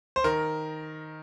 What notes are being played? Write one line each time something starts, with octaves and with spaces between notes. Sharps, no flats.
C5
D#3 A#4